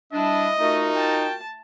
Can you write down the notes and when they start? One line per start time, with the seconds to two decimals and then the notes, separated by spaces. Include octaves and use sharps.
0.13 G3 D4 E4 D#5
0.60 A3 D#4 F4 F#4 A#4
0.96 G5 A5